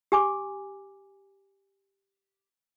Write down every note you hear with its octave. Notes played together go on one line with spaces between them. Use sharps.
G4 G#5 D6